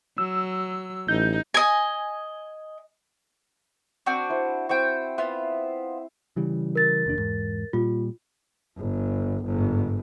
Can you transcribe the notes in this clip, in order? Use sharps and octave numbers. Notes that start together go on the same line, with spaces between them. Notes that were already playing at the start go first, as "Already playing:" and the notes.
F#3 E6
A1 D#4 G6
D#5 G#5
C4 D4 F#4
E4 C5
C4 E4 F#4 C5 G5
B3 F4 E5
C#3 E3 G3
A#4 A6
F1 D#2 D4
E2 G#2
A#2 G3 F4
G1
G1 G#2